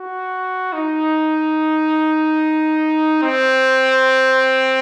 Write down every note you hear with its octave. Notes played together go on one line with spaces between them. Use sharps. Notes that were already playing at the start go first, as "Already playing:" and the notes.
Already playing: F#4
D#4
C4